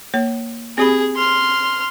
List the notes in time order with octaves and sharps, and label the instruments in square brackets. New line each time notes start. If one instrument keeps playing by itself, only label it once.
[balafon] A#3 C#5
[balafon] C4 G4 B5 [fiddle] G#4
[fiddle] C6 F6